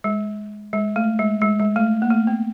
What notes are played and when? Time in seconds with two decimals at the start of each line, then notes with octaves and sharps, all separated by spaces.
0.04 G#3
0.73 G#3
0.96 A3
1.19 G#3
1.41 G#3
1.60 G#3
1.76 A3
2.02 A#3
2.10 A3
2.27 B3